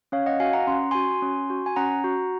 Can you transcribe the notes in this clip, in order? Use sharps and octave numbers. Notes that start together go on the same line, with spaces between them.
C#4 C#5 F5
D#5 F#5
F#4 F5 G#5
F#5 A#5
C#4 C6
F#4 G#5 C6
C#4
F#4
G#5
C#4 F#5 A#5
F#4